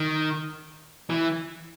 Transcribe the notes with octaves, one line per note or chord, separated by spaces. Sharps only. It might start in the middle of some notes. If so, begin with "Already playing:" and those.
Already playing: D#3
E3